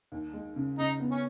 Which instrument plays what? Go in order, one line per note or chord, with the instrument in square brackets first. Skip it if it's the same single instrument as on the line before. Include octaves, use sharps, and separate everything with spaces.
[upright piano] D#2
G#3
C#3
[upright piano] C#3 [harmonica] D#4
[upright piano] B3
[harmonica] C#4